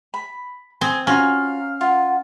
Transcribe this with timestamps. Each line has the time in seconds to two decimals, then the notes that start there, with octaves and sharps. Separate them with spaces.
0.14 B5
0.81 C4 G#5 D#6
1.07 C#4 F4 F#4 F5 A#5
1.81 F4 F#5